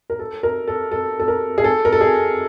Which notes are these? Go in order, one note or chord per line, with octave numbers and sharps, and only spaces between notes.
A#4
A4
A#4
A4
A4
A4
A#4
G#4
A4
A#4
A4
G#4